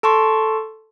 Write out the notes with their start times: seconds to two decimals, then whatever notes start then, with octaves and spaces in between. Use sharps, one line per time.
0.03 A4 A5 C6 C#6